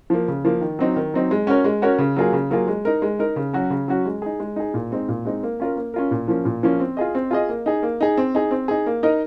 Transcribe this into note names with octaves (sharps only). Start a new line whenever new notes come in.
F3 A#3
C#3
F3 A#3
D#3
F#3 C4 D#4
D#3
F#3 C4 D#4
G#3
C#4 F#4 A#4 C#5
G#3
C#4 F#4 A#4 C#5
C#3
F#3 A#3 F4 G#4
C#3
F#3 A#3 F4 G#4
G#3
D#4 A#4
G#3
D#4 A#4
C#3
F#3 C#4 F#4
C#3
F#3 C#4 F#4
G#3
D#4 G#4
G#3
D#4 G#4
A#2
G#3 C4 D#4
A#2
G#3 C4 D#4
A#3
C#4 F4 A#4
A#3
C#4 F4 A#4
A#2
F3 A#3 C#4
A#2
F3 A#3 C#4
C4
F4 G#4 D#5
C4
F4 G#4 D#5
A#3
D#4 G#4
A#3
D#4 G#4
C4
D#4 G#4
C4
D#4 G#4
A#3
D#4 A#4 D#5